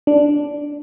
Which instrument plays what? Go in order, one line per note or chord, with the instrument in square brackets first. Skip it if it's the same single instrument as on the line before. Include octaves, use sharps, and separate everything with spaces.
[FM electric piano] D4